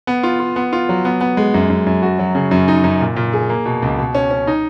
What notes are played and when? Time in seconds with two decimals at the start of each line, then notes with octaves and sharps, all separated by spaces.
0.07 B3
0.23 F4
0.40 F4
0.56 B3
0.73 F4
0.89 F#3
1.05 B3
1.21 B3
1.37 G#3
1.54 F#2
1.70 F#2
1.86 F#2
2.02 F#4
2.19 F#3
2.35 C#3
2.51 F#2
2.68 D#4
2.84 F#2
3.01 A#2
3.16 A#2
3.33 G#4
3.49 A#3
3.66 B2
3.82 C#2
3.98 B2
4.15 C#4
4.31 C#4
4.47 D#4